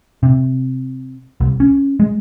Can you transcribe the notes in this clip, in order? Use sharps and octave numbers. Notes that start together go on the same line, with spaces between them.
C3
C2
C#4
G#3